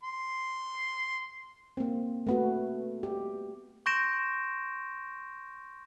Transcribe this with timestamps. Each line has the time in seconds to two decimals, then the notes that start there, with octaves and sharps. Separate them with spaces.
0.03 C6
1.77 A#3 C4
2.27 A3 B3 F#4
3.03 G4
3.86 C6 C#6 G6 A#6 D7 E7